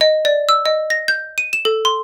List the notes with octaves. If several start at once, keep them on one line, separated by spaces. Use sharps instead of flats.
D#5
D5
E6
D#5
A#6
G6
D#7
E7
A4
C6